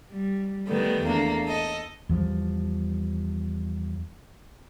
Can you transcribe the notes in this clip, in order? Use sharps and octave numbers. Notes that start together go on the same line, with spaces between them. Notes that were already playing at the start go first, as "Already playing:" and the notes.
G3
D#3 G3 A3 B3
E2 A3 A#3 D4
A4 D#5
E2 F3 G3